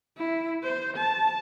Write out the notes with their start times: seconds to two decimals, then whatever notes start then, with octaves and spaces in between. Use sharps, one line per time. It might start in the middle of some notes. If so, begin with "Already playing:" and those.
0.17 E4
0.63 C5
0.97 A5